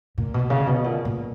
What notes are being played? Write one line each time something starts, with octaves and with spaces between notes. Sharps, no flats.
A#2
B2
C#3
B2
A#2
A#2